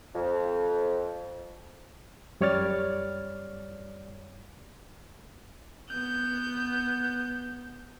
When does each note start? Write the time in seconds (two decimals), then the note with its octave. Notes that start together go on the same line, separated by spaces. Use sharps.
0.15 F2
2.41 F#2 G3 C#5 D5 F6 A6
5.90 B3 G6